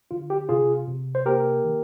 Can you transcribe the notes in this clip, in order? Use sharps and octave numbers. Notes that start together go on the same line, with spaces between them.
D3 F4
G4
C3 F4 G#4
C3
C5
A#3 G4 A#4
D#3